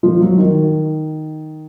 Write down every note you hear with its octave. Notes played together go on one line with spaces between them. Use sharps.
F3
F#3
D#3